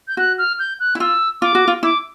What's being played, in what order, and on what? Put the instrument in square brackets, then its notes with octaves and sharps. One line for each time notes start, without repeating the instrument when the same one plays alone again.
[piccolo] G6
[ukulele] F#4 [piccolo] F#6
[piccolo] F6
G6
F#6
[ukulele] E4
[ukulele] F4 [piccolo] E6
[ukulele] F4 [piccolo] D6
[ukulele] F#4
F4
[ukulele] E4 [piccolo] D6